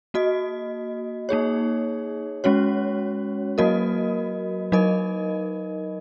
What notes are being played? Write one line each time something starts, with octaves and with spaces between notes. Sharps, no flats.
A#3 F#4 D#5
A#3 D#4 G#4 C#5
G#3 C#4 F#4 C#5
F#3 A#3 F#4 A#4 D#5
F#3 D#4 A#4 D#5